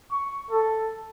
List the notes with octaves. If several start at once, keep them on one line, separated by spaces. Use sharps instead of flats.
C#6
A4